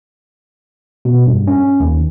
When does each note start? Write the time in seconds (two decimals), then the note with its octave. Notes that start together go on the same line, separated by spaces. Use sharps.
1.05 B2
1.27 G2
1.47 C#4
1.80 D#2